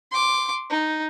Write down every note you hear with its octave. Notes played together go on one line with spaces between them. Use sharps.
C6 D6
D#4